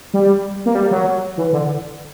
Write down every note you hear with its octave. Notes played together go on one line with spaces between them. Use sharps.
G3
A#3
G3
F#3
E3
D3